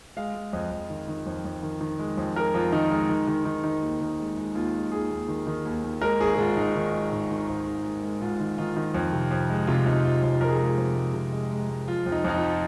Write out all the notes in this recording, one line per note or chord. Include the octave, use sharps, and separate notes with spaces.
G#3 F5
G#3
F2 D#5
F2
D#3
D#3
F2
F2
D#3
D#3
G#3
F2
G#3 A#4
F2 F4
D#3 D#4
G#3 D#4
D#3
D#3
D#3
D#3
D#2
D#3
G#3
G#3
D#2 F4
G#3
D#2 G#4
D#2
D#3
D#3
D#2
D#2
G#3 A#4
G#1 G#4
G#4
G#2 F4
G#2 D#4
D#3
G#3
G#2
D#3
G#1
G#1
G#3
G#3
G#2 F4
D#3
D#3 F4
D#3
F2
C3
F2
G#3
C3 F4
F2 D#4
F2 F4
F2 F4
F2 A#4
G#4
F4
G#3 G#4
F2
G#3
C3
G#3
G#3
G#3
F3 F4
F2 F4
D#4
F2 D#4
F4
F3